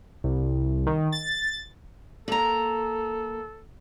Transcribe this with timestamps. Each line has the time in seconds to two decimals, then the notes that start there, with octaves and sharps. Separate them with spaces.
0.24 C2
0.86 D#3
1.12 A6
2.28 A#3 A4 A#5